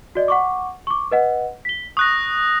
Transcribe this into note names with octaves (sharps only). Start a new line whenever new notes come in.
F#4 D5 D#5
F#5 C#6 D6
C#6 D6
B4 D#5 F#5
B6 G7
C#6 D#6 F#6 A#6